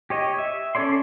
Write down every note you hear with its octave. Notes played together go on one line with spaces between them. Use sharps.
G4 C#5 D#5
E5
C#4 A4 C#5 D5 C6